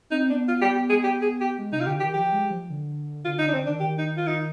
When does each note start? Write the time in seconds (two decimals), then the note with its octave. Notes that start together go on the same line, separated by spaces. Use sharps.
0.11 C4 D#4
0.30 B3 D4
0.48 F4
0.62 G4
0.75 G4
0.90 G#4
1.04 G4
1.22 G#4
1.41 G4
1.58 G#3
1.72 C3 D#4
1.80 F4
1.86 D3 G4
2.00 D#3 G4
2.14 F3 G4
2.32 G#3
2.50 F3
2.70 D3
3.25 D3 F4
3.38 D3 D#4
3.48 D4
3.53 D3 C4
3.66 D#3 D4
3.80 D#3 G4
3.99 D#4
4.17 F4
4.27 D#4